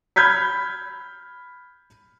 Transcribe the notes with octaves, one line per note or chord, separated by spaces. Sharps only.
B5 F6 G6 G#6 B6